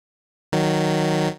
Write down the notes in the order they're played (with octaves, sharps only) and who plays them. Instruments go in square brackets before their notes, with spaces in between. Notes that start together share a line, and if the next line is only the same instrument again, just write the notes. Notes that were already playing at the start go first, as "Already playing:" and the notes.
[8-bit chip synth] D#3 F#3